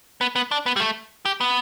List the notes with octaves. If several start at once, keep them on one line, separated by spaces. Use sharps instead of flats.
B3
B3
D4
B3
G3
A3
G4
B3